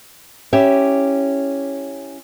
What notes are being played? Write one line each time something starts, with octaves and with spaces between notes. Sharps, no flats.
C#4 E4 G4 E5